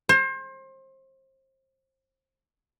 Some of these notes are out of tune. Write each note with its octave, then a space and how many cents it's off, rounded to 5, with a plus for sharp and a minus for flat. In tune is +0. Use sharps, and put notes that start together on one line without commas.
C5 +30